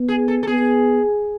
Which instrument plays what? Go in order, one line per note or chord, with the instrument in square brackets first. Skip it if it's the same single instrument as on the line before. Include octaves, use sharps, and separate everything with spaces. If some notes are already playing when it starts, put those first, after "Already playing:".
Already playing: [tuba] B3
[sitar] G#4
A4
A4
[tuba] B3 [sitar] G#4